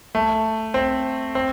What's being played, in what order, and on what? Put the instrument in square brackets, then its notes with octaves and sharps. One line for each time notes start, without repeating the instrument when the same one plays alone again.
[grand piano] A3
C4
C4